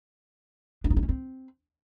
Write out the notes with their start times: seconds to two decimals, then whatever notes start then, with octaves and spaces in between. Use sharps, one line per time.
0.84 D4
0.90 D#4
0.97 D4
1.03 C#4
1.09 C4